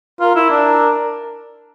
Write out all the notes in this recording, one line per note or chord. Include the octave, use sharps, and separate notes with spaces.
F4 A#4
E4
D4